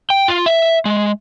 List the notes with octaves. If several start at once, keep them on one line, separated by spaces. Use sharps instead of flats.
G5
F4
E5
G#3